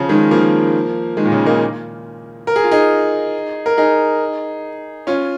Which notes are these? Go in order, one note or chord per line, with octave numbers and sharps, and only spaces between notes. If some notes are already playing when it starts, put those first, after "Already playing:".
Already playing: C#3 F3
D#3 G#3
F3 A#3
D#3 G#3
A#2
C#3
A#3 D#4
A#4
G#4
F4
D#4 G#4
A#4
D#4 G#4
C#4 F4